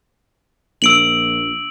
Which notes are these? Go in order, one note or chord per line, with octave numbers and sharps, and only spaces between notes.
A#1 E6 D7 F#7